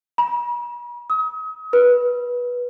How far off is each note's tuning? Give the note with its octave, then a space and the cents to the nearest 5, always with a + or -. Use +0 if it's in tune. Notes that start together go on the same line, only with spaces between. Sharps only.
B5 -45
D#6 +40
B4 -20